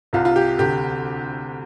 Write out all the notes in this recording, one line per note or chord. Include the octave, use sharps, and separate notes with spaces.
C2 C3 F4
F4
G4
D2 C3 G4